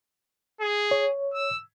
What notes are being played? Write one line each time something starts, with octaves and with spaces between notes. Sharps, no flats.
G#4
C#5
E6